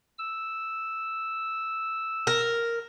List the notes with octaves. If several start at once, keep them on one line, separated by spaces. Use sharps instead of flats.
E6
A#4